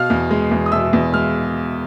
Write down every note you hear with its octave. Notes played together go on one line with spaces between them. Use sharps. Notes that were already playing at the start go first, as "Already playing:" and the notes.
Already playing: B2 F5 F6
E2
G#3
E2
D#6
B2 E5 E6
E2
G#3 F6